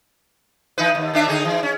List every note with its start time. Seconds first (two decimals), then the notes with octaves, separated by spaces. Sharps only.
0.78 E3 D#4 B4
0.95 D#2
1.13 D#3 D4 E5
1.28 D3 D#4 G#4
1.45 E3
1.63 C#4